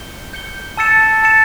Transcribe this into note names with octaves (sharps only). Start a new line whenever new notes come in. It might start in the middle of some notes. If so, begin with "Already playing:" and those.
Already playing: G6 C#7 G7
G6 C#7 G7
A5 E6 A6 C#7 E7
A5 E6 A6 C#7 E7